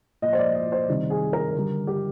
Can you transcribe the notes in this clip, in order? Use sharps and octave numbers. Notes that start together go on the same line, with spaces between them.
A#2 F3 D#5
C5
D5
D#5
C5
C3 D#3 G3
G#4
A#4
D3 G3
G4